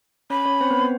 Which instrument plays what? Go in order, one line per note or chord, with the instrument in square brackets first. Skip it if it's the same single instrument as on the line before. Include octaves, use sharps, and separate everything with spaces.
[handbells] C#4 C#5 [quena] B5
[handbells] C#4 C#5
C4 C5
B3 B4
B3 B4